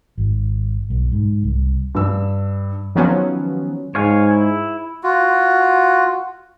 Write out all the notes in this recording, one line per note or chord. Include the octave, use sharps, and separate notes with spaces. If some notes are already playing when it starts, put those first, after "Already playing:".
G#1
B1
G#2
C2
G2 E6
D#3 F3 F#3 B3 C#4
G#2 C#5 F5 G#5
E4
F4 F#4